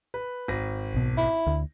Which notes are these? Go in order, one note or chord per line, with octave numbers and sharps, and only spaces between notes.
B4
G#1 A#6
B1 B2
E4
D2